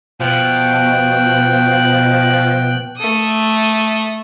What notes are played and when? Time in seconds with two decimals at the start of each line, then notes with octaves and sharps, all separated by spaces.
0.20 B2 F3 G5 F#6
2.97 A3 D#6